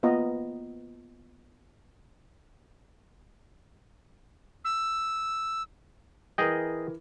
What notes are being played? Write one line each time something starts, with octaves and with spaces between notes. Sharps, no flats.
A#3 B3 F4 D#5 A#5
E6
E3 G#4 A#4 D#5 G5